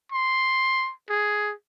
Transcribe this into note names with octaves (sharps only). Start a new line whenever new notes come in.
C6
G#4